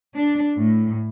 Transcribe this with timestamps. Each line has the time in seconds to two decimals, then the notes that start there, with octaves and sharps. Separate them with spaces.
0.15 D4
0.57 A2